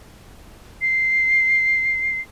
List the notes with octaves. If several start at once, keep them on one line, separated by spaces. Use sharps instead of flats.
C7